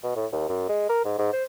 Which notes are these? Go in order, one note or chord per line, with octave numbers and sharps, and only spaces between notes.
B2
A2
D#2
F#2
G#3
A#4
G#2
G#2
C5